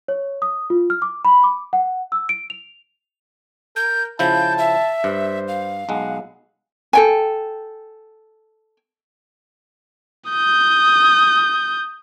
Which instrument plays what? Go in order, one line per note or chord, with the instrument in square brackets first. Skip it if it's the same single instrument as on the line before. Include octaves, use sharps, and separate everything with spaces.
[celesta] C#5
D#6
F4
F6
D6
B5
D6
F#5
E6
D7
F7
[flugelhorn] A#4 [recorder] G6
[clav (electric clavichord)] C#3 F3 E4 [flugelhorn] A5 [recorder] G6
[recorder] E5
[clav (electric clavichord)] G2 [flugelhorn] C5
[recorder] F5
[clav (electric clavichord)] B1 G#3 [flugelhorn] F#5
[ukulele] A4 G5 G#5
[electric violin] D#6 G6